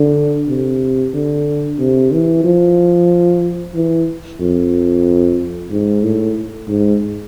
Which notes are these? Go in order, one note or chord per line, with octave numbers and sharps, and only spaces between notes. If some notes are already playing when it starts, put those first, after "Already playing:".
Already playing: D3
C3
D3
C3
E3
F3
E3
F2
G#2
A2
G#2